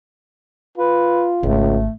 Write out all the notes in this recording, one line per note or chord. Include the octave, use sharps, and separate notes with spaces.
F4 B4
G#1 C#2 A3